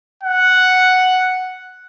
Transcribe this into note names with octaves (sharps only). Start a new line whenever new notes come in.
F#5